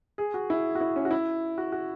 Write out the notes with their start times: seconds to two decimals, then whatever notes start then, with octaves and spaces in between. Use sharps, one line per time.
0.18 G#4
0.34 F#4
0.50 E4
0.75 F#4
0.81 E4
0.96 C#4
1.05 F#4
1.11 E4
1.58 F#4
1.72 F#4